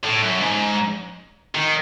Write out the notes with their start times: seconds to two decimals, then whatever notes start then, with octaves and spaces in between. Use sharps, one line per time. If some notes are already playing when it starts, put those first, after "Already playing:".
0.04 A2
0.22 F#2
0.41 G#2
1.55 D#3